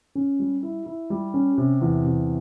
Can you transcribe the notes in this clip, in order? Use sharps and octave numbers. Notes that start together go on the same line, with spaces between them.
C#4
G3
E4
E4
G3
C#4
C3
E2
C3